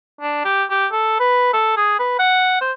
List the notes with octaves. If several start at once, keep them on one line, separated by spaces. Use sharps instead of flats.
D4
G4
G4
A4
B4
A4
G#4
B4
F#5
C5